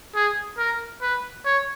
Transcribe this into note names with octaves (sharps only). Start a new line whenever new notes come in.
G#4
A#4
B4
C#5